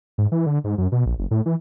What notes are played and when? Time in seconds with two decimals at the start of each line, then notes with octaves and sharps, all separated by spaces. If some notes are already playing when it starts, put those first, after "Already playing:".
0.18 G#2
0.32 E3
0.46 D3
0.64 G#2
0.78 F#2
0.92 B2
1.06 A#1
1.18 F#1
1.31 A2
1.46 E3